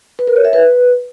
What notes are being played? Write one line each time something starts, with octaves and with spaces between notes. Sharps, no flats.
B4
A#4
C#5
E5
B4